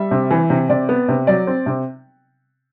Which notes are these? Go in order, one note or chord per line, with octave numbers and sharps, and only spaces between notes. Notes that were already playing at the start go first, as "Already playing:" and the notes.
Already playing: G3 E5
C3
E3
C3
C3 D5
B3
C3
F#3 D5
C4
C3